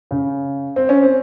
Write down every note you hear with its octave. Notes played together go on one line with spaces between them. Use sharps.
C#3
C4
C#4
C4